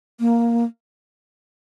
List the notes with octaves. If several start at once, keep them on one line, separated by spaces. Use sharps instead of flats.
A#3